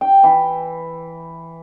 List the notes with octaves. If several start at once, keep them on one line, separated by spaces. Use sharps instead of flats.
G5
E3